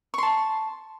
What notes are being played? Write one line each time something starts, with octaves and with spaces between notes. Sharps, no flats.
A5 C6 C#6